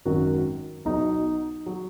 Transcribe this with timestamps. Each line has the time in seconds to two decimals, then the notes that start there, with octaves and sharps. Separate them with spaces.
0.05 G#1 F#2 D#3 F#3 F#4
0.85 B1 B2 F#3 D#4
1.66 F#3